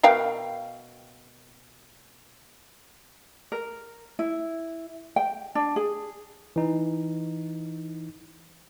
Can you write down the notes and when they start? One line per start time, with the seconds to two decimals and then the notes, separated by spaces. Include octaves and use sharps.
0.03 B2 A#4 F5 G5
3.52 A#4
4.19 E4
5.16 G5
5.55 D4
5.76 G#4
6.56 E3 D#4